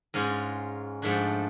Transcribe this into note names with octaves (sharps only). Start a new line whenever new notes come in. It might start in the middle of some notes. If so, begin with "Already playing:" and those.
G#2 G#3 C#4 F4 G#4
G#2 F3 A3 D4 G#4